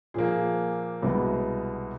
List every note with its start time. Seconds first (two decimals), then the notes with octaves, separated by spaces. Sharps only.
0.14 A#2 F3 A#3 G#4
1.02 C2 B2 G#3 B3